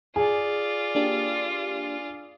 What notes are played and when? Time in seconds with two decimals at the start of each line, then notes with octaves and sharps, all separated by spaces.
0.16 F4 G#4 D5
0.95 A#3 D4 G4